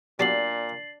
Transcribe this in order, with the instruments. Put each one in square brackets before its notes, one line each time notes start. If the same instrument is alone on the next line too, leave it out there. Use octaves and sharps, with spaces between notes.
[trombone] A#2 [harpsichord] F#3 B3 G4 [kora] D4 [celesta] A6 C7 F#7